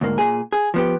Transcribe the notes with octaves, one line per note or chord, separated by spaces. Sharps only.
D2 G#2 A#3
A#2 G#4 G#5
G#4
F3 B3 G4